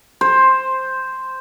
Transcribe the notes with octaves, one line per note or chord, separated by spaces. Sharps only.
C5